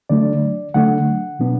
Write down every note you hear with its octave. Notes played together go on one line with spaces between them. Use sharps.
D3 F#3 A3 D4 D5
D3 F#3 A3 D4 F#5
B2 F#3 B3 D4